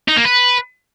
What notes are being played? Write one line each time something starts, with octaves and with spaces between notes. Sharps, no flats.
D#4
A#3
B4